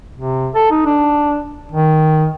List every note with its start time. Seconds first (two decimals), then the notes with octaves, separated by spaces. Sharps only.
0.16 C3
0.55 A4
0.71 D#4
0.86 D4
1.72 D#3